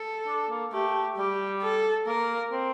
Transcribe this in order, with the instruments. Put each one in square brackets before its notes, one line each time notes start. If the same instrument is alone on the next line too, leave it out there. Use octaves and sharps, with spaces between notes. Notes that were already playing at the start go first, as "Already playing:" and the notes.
Already playing: [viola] A4
[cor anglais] D4
A#3
[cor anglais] A3 [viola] G4
[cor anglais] G3 [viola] G4
[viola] A4
[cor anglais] A#3 [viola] A#4
[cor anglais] C4